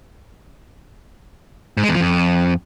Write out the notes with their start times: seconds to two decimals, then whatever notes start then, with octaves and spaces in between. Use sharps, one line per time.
1.77 G#2
1.83 G#3
1.89 E2
1.95 F3
2.01 F2